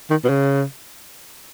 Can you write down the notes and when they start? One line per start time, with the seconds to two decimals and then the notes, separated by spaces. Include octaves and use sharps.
0.10 D#3
0.24 B2
0.29 C#3